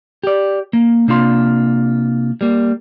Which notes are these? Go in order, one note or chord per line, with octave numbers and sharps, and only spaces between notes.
G4 D5
A#3
C3 A#3 D4 F4 C6
G3 A#3